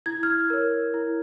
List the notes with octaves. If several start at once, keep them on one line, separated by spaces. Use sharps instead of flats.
E4 G#6
F6 G#6
A#4 C#5
E4